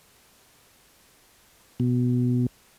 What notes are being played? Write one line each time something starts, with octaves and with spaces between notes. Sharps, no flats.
B2